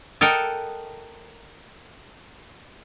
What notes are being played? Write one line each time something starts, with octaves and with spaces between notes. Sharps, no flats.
A4 A#4 D#5 F#5 G5